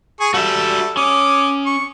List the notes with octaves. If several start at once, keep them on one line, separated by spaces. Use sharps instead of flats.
G#4 G#5 C#6
G3 F#4 A4 E5
C#4 D6 D#6
C#6